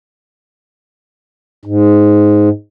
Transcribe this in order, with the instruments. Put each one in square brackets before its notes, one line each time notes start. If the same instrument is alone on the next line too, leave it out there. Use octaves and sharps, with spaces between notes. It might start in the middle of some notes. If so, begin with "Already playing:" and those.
[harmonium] G#2